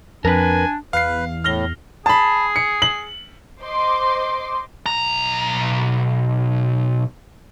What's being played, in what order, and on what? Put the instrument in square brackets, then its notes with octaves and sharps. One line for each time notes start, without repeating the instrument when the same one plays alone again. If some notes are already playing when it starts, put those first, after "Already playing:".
[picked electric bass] F2 [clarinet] D4 [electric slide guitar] A#4 B4 [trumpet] G#5
[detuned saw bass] E2 [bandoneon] B4 [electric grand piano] F5 C7
[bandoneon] A2 [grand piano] F6 A#6 G7
[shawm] G#4 [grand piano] A5 B5
[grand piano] C#7
F#7
[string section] C5 D#5 C6 D6
[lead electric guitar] B1 A#5